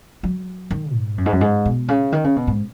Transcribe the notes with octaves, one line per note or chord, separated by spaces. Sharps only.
F#3
D#3
G#2
F#2
G#2
F#2
G#2
B2
C#3
D#3
C#3
B2
G#2